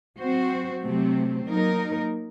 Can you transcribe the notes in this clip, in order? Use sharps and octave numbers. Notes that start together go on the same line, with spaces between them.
F#3 C4 F#4 C5
C3 F#3 A3 C4
F#3 A#3 D#4 A#4